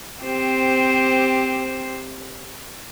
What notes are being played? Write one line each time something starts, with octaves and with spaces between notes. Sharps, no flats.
C4 G4 C5